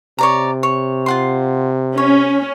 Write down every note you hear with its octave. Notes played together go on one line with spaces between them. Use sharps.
C3 C#5 D5 A#5
C#5
F4 F#5 C6
C#4 C#5